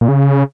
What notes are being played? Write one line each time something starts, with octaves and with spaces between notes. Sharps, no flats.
A#2
C#3